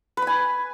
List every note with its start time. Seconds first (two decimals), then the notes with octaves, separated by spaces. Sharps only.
0.17 B4
0.22 B5
0.27 G#5